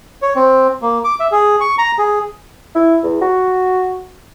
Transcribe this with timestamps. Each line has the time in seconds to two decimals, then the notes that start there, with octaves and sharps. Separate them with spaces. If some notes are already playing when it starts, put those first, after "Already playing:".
0.22 C#5
0.35 C4
0.82 A#3
1.04 D6
1.20 E5
1.32 G#4
1.61 C#6
1.78 A#5
1.98 G#4
2.75 E4
3.03 E2
3.21 F#4